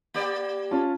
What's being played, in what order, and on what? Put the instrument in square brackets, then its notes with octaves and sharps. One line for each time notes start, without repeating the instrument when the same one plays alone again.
[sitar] A#3 G4 D5
[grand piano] C#4 F4 A5